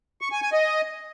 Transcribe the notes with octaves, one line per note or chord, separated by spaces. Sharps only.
C#6
G#5
G#5
D#5